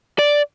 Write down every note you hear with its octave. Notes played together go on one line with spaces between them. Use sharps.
D5